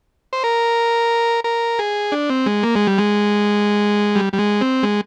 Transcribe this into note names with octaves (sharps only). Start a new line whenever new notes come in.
C5
A#4
A#4
G#4
D4
C4
G#3
A#3
G#3
G3
G#3
G3
G3
G#3
C4
G#3